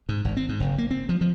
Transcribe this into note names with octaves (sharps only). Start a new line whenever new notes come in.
G#2
G#1
C4
G#2
F#1
A#3
C4
F3
F3